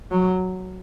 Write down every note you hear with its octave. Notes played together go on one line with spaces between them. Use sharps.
F#3